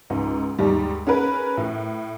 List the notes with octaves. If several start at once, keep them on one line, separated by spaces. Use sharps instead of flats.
C#2 G#2
D#2 G#2 G3
C#4 G#4 A#4 B4
A2